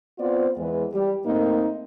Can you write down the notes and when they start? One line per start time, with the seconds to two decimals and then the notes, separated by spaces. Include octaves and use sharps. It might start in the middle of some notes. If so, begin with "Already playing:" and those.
0.19 B3 C4 F4 C5 D5
0.57 E2 E3 G#3 B4
0.93 G3 G4
1.26 A2 A3 A#3 C4 D#4